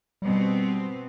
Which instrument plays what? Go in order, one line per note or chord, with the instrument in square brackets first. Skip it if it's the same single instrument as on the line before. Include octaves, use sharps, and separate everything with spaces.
[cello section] B2 C4 [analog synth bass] G3